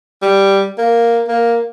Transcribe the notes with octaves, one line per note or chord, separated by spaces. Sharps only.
G3
A#3
A#3